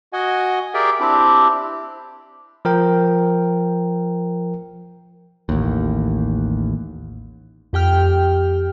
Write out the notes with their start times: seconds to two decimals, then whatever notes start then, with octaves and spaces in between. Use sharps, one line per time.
0.13 F#4 D#5 F#5 G#5
0.74 G4 G#4 A#4 D5 E5 G5
1.00 C4 D4 E4 G4
2.65 F3 A#4 G5
5.49 A1 D#2
7.73 F2 G4 G5 F6